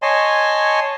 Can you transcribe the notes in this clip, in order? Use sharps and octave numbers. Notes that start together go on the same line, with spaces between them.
C#5 D#5 G#5 A5 C6